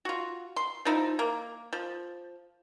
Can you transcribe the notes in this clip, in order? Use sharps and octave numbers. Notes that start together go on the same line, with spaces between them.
F4 F#4
C6
F3 D#4 E4
A#3
F3